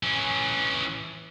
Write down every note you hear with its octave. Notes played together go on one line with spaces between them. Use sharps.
E3 C#4